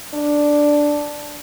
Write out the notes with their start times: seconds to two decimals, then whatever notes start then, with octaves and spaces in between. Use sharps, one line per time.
0.14 D4